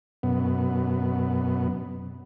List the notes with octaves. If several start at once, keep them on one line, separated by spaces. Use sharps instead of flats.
F#2 B2 B3